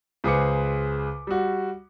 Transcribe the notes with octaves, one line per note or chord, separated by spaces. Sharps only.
C#2 G#4 B4 C5 D6 C#7
G3 F#4